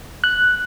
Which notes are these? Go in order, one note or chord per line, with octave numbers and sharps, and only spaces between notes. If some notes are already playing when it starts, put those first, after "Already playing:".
F#6